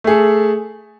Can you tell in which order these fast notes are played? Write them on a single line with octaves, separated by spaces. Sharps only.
A3 G#4 A4